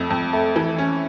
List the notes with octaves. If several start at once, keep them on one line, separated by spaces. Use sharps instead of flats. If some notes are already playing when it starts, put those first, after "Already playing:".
Already playing: F2 A3
F2
A3
E3
C#4